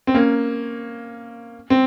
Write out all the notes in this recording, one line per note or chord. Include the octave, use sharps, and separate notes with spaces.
C4
A#3 C#4
C4